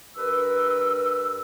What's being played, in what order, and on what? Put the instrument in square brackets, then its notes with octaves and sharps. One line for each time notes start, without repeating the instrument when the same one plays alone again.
[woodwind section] G2 A#4 B4 E6